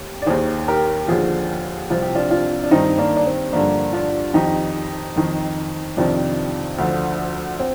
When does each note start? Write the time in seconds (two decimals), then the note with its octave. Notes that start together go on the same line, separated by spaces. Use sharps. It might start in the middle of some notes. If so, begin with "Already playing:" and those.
Already playing: D#2
0.22 D5
0.26 D#2 D#3 G#4 C5
0.68 G4 A#4
1.08 D#2 D3 F3 F4 G#4
1.90 C2 C3 F3 F4
2.02 G4
2.15 D4 F4
2.30 D4 F4
2.64 D4
2.71 G2 D#3 C4 D#4
2.98 A#3 D4
3.17 D4
3.26 C4
3.52 G2 D3 F3 A#3 D4
3.93 D4 F4
4.34 F2 D#3 D#4 G4
5.16 F2 D#3
5.97 F2 C3 D#3 D4 F4
6.78 D2 D3 F3
7.59 C4